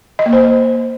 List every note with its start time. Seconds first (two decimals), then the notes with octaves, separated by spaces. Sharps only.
0.19 D#5
0.26 A#3
0.33 C5